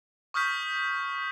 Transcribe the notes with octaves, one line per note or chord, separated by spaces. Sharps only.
C#6 D#6 F6 G6 B6